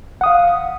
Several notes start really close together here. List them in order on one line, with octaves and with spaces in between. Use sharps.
F#5 D#6 F5